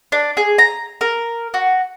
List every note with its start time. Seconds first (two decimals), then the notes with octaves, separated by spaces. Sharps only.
0.12 D4
0.37 G#4
0.58 A#5
1.01 A#4
1.54 F#4